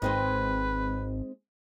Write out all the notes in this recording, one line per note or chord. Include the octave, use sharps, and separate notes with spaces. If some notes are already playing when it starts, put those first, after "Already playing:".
G#1 G#3 C4 D#4 B4